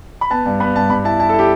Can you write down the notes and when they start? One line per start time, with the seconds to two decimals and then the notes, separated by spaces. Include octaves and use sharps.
0.21 B5
0.31 B3 A5
0.46 G2
0.60 B3 B5
0.75 G2 A5
0.90 G2 B5
1.04 E4 A5
1.19 E4 A5
1.29 A4
1.34 E4
1.39 G4